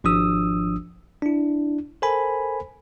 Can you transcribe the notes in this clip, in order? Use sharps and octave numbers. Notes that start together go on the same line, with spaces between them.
G#1 F3 D4 D#6 E6
D4 E4
A4 A#4 C5 G#5 B5